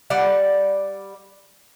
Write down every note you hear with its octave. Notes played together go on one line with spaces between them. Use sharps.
G3 D5 F#5